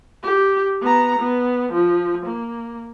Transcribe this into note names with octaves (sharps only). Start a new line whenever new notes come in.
G4
B3 A#5
B3
F3
A#3